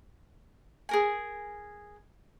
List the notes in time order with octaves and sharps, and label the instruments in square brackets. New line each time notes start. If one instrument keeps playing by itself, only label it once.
[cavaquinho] G#4 A#4 G#5